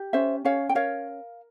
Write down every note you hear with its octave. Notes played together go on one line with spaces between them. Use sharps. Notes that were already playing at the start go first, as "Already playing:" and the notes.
Already playing: G4
C#4 C5 E5
C#4 C#5 F5
G5
A#4 C#5 F5